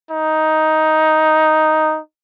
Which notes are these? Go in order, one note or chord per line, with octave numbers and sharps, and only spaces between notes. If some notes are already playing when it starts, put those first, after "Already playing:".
D#4